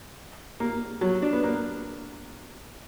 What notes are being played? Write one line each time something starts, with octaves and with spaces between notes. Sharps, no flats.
A#3
F#3
D4
B3
A#3